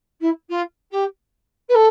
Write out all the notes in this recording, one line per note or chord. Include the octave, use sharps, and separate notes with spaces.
E4
F4
G4
B4
A4